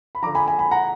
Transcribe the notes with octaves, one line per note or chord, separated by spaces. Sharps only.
B5
D3 F3 A#5 D6
G#5 B5
G#5 B5
G#5 B5
F#5 A#5